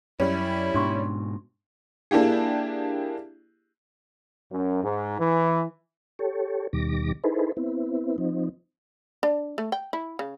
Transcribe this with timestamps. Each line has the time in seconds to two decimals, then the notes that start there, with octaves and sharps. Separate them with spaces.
0.20 F#2 G3 C#4 E4
0.74 G#2 B2 D4 C6 C#6
2.11 A#3 D4 E4 G4 G#4
4.51 F#2
4.83 G#2
5.19 E3
6.19 G4 A4 C#5
6.73 D#2 B2 D#3 G3 D6 A#6
7.24 D#4 E4 G#4 A4 B4 C5
7.57 B3 C4 E4
8.18 F3 C4 D#4
9.23 D4
9.58 A3
9.72 G5
9.93 E4
10.19 C#3